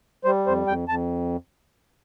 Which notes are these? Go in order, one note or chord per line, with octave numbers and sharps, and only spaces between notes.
G3 C5
F2 C5
F2 G5
F2 A5